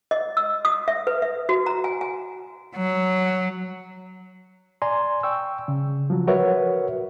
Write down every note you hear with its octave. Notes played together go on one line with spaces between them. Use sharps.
D#5
E6
D#6
E5
B4
E5
F#4
A#5
G#5
G#5
F#3
D5 G#5 A#5 C6
G5 C#6 E6
C#3
F3 F#3
F#4 A#4 B4 C#5 E5 F#5